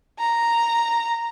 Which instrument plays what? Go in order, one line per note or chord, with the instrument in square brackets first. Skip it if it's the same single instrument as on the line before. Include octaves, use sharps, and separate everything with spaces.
[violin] A#5